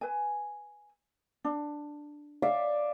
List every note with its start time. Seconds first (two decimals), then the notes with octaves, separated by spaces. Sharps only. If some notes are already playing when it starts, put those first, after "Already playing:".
0.01 B4 G#5
1.44 D4
2.42 D5 E5 F5